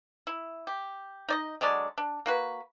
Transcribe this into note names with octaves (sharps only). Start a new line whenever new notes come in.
E4
G4
D#4 D5 D#5
D3 F#3 G#3 D5
D4
A#3 F#4 B4